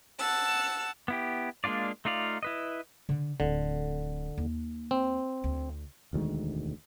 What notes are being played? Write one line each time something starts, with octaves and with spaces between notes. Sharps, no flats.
F#5 A5 E6
B3 E4 G4
G#3 A#3 D4 F4 D5
A3 D#4 F4 D5 F5
E4 B4 D#5
D3
D1 D3 C4
D#2
C4
D2
E1 D2 D#3 G#3